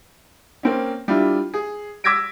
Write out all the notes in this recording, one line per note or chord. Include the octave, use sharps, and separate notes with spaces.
A#3 C4 C#4
G3 D4 E4 F4
G#4
D6 E6 G#6 A#6 B6 D7